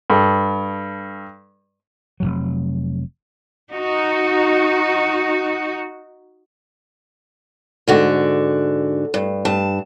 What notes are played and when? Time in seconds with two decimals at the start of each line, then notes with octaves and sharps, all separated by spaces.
0.10 G2 A4
2.20 F1 C2 F#3
3.71 D#4 F#4
7.88 G#2 D3 F#4
9.14 G2
9.45 G2 A5